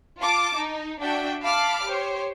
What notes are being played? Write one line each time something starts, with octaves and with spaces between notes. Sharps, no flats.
F4 A5 D6
D#4
D4 F#4 E5 G5
F5 A5 B5 D6 F6
G4 C5 C#5